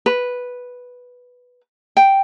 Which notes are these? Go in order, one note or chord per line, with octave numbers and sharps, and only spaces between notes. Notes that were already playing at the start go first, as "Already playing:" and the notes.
B4
G5